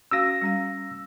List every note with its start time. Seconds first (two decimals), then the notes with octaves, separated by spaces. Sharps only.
0.11 C#4 F#4 F5 E6 A#6
0.41 G3 C#4 F5